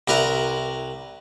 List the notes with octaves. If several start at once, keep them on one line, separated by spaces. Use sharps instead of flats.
C2 E4 A#4 B4